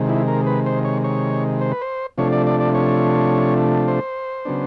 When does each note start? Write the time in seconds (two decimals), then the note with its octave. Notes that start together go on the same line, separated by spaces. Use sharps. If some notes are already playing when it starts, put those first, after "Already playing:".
Already playing: C3 D#3 G#3
0.09 E4
0.28 A#4
0.47 B4
0.66 C5
0.85 C#5
1.04 C#5
1.61 C5
1.72 B4
1.81 C5
2.18 C3 F3 A3 D4 C#5
2.32 D5
2.47 D5
2.60 D5
2.74 C#5
3.88 C5
4.45 C#3 F#3 B3 D4